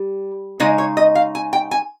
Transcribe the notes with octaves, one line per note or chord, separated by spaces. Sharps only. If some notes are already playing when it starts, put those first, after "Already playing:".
Already playing: G3
C#3 G#3 D#4 D#5
C#5
D#5
F5
G#5
G5
G#5